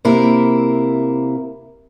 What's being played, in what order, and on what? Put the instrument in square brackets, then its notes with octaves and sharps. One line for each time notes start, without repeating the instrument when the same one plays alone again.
[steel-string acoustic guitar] C3 A#3 E4 A#4